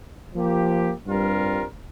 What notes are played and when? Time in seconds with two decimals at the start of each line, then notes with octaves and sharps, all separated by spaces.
0.34 F3 A#3 G4
1.07 G2 G3 C4 F4 A#4